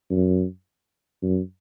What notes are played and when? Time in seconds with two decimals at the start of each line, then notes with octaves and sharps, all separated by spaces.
0.11 F#2
1.23 F#2